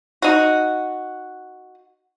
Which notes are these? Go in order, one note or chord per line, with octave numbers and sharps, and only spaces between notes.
D#4 F#4